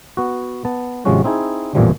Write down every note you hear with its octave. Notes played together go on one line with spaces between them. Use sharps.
B3 F#4
B3 A5
G#1 C3 F3 G#3 C#4 F#4
C4 D#4 E4 G#4
A1 F2 A#2 E3 F3 G3